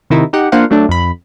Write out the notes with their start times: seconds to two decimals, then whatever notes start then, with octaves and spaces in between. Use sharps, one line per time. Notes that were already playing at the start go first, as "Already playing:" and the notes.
0.10 C3 D#3 D#4 E4
0.33 D#4 G4 F#5
0.52 A#3 D4 F4 C5 F5 F#5
0.70 F#3 A3 D4
0.89 F2 B5